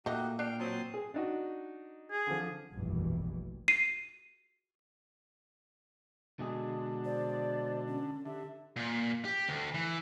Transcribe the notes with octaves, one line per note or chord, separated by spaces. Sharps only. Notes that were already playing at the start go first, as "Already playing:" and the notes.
A#2 A3 D#4 F#4 G4 D#5
D4 G5 F6
F#3 C4 A5 C6 D#6
G#4
D4 D#4 F#4
G#4
D3 F3
F1 A#1 G2 B2 D#3 E3
C7 D#7
B2 D3 G#3 G#4
C5 D5
C#4
D3 G4 E5
A#2
G4
D2
E3